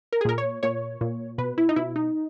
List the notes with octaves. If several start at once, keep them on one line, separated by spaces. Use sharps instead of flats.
A#4
G#4
A#2 A#4
C#5
A#2 C#5
A#2
B2 B4
E4
D#4
B2 E4
D#4